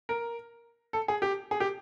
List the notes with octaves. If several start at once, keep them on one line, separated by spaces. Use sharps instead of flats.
A#4
A4
G#4
G4
G#4
G4